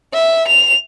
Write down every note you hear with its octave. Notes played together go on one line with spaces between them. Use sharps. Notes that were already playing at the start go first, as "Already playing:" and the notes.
E5
F7